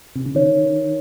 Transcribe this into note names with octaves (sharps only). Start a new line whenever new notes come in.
C3
C#3
D#3 C#5